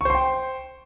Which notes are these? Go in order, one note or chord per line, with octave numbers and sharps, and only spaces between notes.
C5 G5 C6 C#6